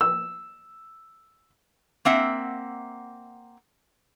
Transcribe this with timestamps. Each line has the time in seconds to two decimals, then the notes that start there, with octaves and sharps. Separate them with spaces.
0.01 E6
2.05 A#3 C4 E5 F#5